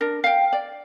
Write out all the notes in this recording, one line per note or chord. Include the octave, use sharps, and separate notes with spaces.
D4 A#4
F5 G5
D5